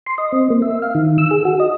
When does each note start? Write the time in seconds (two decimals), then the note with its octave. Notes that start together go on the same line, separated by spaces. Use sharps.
0.07 C6
0.18 D#5
0.32 C4
0.50 A#3
0.62 E5
0.82 F5
0.95 D#3
1.18 E6
1.31 G#4
1.45 F#4
1.60 D#5